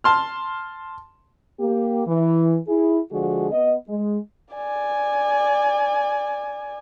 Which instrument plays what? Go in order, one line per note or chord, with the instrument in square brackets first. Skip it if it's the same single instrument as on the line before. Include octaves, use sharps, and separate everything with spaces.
[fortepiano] A5 C6 F6
[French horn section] A#3 G4
E3
E4 G#4
D3 F3 G#3 F#4 G#4
B3 D#5
G#3
[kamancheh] D5 G#5